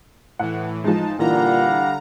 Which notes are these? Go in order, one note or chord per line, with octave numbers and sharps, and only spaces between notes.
A2 E3 F#5
F3 G#3 D#4 A5
A#2 D3 E3 G3 F5 F#5 A#5